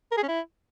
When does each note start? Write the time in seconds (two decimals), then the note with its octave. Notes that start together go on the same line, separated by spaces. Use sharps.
0.12 A#4
0.17 G#4
0.23 C#4
0.29 E4